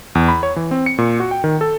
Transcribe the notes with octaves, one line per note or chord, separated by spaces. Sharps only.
E2
B5
C#5
E3
C4
C#7
A#2
F#4
G5
D#3
A4